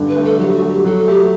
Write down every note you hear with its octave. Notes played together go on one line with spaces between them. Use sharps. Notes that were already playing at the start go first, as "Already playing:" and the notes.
Already playing: G2 D3
B4
A3
A4
F#3 G4
F#4
A3
G4
F#3 A4
A3 G4